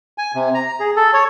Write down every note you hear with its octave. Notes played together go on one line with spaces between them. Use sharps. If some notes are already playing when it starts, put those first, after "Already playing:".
G#5
C3
A#5
G#4
A4
C#5